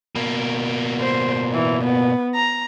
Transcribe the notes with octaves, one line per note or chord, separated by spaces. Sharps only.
B2 A#3
C5
E3
B3
A#5